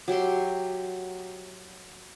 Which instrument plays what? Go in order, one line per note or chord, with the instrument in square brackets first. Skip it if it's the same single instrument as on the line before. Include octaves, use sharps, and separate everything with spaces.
[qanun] F#3 G4 E5 C6